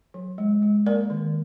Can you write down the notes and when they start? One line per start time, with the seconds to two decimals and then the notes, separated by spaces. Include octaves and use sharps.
0.14 F#3
0.38 G#3
0.62 G#3
0.86 A#3 A#4 D5
1.10 D#3